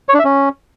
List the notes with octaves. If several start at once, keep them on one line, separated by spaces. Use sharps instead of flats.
C#5
D4
E5
C#4